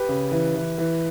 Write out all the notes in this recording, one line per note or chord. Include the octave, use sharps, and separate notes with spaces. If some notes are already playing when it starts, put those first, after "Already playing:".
Already playing: G4 B4
C#3
E3
E3
E3